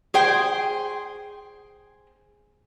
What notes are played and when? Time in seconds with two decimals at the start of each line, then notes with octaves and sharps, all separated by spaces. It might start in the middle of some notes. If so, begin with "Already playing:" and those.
0.14 G#4 C5 G5